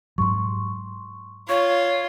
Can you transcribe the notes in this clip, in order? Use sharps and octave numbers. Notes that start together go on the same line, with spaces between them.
G#2 F#3 C6 C#6
F4 C#5 C#6